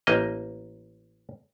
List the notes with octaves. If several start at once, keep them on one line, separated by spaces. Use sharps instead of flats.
A1 A#3 D#5